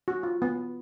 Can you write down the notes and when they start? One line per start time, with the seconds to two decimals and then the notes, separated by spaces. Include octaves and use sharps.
0.08 F#4
0.23 F4
0.42 B3